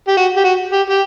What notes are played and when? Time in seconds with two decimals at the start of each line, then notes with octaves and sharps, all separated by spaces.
0.08 G4
0.17 F#4
0.37 G4
0.44 F#4
0.72 G4
0.90 G4